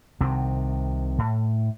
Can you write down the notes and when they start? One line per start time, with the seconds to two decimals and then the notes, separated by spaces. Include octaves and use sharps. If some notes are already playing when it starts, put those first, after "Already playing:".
0.20 C2 C3 D#3 C4
1.18 A2